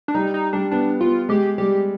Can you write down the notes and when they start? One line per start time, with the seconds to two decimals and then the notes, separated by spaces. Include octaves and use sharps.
0.08 D4
0.14 G3 D#4
0.34 D#4
0.53 G3 D4
0.71 B3 D4
1.01 B3 F4
1.29 G#3 G4
1.58 G3 G4